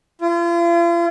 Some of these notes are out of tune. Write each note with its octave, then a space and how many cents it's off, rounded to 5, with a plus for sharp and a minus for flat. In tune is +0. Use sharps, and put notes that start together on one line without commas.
F4 -40